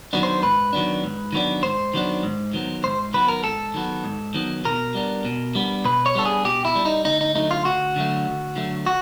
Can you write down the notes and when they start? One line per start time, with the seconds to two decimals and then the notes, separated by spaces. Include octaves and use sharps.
0.13 D#3 F#3 B3 D4
0.23 C5
0.43 G#2 B4
0.73 D#3 F#3 B3 D4
1.04 G#2
1.32 D#3 F#3 B3 D4
1.63 G#2 C5
1.94 D#3 F#3 B3 D4
2.23 G#2
2.53 D#3 F#3 B3
2.84 G#2 C5
3.13 D#3 F#3 B3 B4
3.29 A#4
3.44 G#2 A4
3.74 D#3 F#3 B3
4.04 G#2
4.34 D#3 F#3 B3
4.65 B2 A#4
4.95 G3 B3 D4
5.25 B2
5.55 G3 B3 D4
5.84 B2 B4
6.06 C#5
6.15 G3 B3 D4 A4
6.25 G#4
6.45 B2 G4
6.65 E4
6.75 G3 B3 D4
6.85 D#4
7.05 D2 D#4
7.21 D#4
7.35 D3 F#3 A3 D#4
7.51 F4
7.65 D2 F#4
7.96 D3 F#3 A3
8.26 D2
8.56 D3 F#3 A3
8.86 F#4